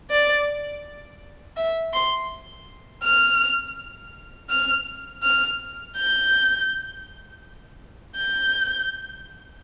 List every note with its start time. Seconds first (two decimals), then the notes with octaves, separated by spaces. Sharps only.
0.11 D5
1.57 E5
1.93 C6
3.04 F6
4.50 F6
5.23 F6
5.97 G6
8.16 G6